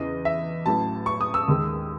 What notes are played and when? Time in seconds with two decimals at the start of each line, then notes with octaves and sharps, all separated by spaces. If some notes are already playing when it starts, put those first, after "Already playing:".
Already playing: E2 C#3 E3 D#5
0.25 E5
0.66 A1 A2 F#3 A5
1.06 C#6
1.21 D#6
1.34 E6
1.48 D#2 D#3 G#3